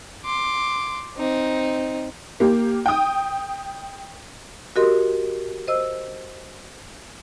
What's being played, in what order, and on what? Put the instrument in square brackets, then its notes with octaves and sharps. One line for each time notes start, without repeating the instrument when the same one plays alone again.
[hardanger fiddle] C6 D6
C4 D#4
[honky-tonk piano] A#3 G4
G5 D#6
[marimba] F#4 G4 A#4 D#5 C6
C5 D#5 E6